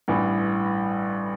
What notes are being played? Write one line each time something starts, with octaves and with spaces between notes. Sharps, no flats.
A1 G2 E3